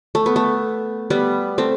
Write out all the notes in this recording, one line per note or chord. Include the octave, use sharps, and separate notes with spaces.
A3
B3
A3
G3 B3
A3 C4